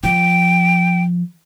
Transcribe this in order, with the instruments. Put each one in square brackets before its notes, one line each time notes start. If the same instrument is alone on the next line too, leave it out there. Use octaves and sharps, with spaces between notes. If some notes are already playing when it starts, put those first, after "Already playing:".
[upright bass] F3 [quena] G5